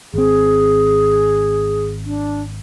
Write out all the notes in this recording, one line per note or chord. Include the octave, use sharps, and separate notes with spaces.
G#1 C4 G#4
D4